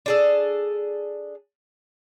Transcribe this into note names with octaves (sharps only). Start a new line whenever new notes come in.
D4 G#4 A4